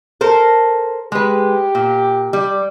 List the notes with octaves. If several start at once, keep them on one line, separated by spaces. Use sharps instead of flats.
A4 A#4 C5
G#3 G4 B4
A#2
G3